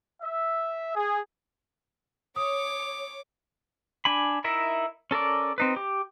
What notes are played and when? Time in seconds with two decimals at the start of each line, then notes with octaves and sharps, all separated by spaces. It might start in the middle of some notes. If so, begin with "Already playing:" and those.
0.22 E5
0.96 G#4
2.36 C#5 D6 D#6
4.05 D4 G#5 B5
4.44 D#4 E4 A#4 E5
5.11 C#4 A4 A#4 D5
5.58 C4 D#4 B4
5.76 G4